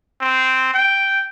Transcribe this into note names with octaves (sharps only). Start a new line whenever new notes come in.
C4
G5